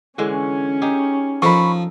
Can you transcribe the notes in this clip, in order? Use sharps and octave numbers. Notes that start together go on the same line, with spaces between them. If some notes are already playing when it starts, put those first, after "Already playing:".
D3 E3 G#3 C#4
D#4 G4 G#4
F3 D#4 A4 A#4 B5 C#6